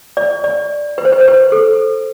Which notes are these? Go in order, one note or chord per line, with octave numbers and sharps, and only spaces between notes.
D5
D5
B4
C5
B4
C5
B4
A4